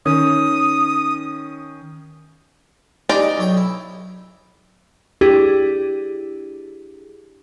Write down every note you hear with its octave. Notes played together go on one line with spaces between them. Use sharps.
D#3 C#4 D#6
G#3 D#4 G4 D5
D#5
B1 C#5 G5
E4
D4 E4 G4 G#4